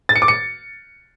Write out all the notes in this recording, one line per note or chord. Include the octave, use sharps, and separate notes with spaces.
A6
C#7
D6
C#7